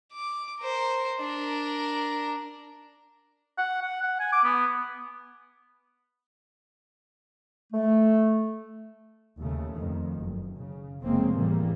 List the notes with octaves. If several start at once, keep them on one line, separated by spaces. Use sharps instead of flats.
D6
A#4 C5
D4 A#4
F#5
F#5
F#5
G#5
D6
B3
A3
D#2 C#3 A3
F2 D#3
F#1
C#3
F1 C#3 G#3 A#3 C4
A2 E3 G3 A#3